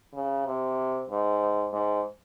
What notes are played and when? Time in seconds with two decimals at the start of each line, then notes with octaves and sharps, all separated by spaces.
0.14 C#3
0.46 C3
1.10 G#2
1.72 G#2